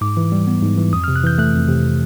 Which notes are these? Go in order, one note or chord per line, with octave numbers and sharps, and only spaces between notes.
G#2 D6
E3
G3
B3
G#2
E3
F2 D#6
C3 F6
F#6
E3 G6
A3 F#6
F2
C3